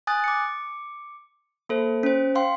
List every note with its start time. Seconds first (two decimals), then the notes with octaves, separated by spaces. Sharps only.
0.07 G#5 D#6 F#6 A6
0.24 D6 C#7
1.69 A#3 A4 C5
2.03 C#4 C5
2.35 F5 G5 C6